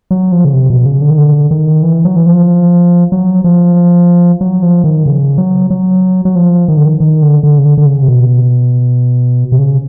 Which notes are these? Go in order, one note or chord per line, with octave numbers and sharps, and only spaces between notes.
F#3
F3
C#3
C3
B2
C#3
D3
D#3
D3
D#3
E3
F#3
E3
F3
F#3
F3
F#3
F3
D#3
C#3
F#3
F#3
F#3
F3
D#3
D3
D#3
D#3
D3
D3
C#3
D3
D3
C#3
C3
B2
C3
C#3